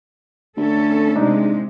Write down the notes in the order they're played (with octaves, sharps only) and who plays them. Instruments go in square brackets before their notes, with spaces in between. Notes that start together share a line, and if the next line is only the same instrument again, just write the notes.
[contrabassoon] D2 [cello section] C#4 A4
[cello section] C3 G#3 [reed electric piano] D4 D#4